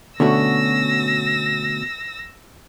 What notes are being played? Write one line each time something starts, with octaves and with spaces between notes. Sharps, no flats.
B2 D3 A3 C#4 F#4 E6 A#6